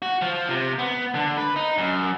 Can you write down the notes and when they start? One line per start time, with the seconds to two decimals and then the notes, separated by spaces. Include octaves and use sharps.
0.02 F#4
0.22 F3
0.49 C3
0.79 B3
1.15 D3
1.37 B4
1.56 D#4
1.78 F#2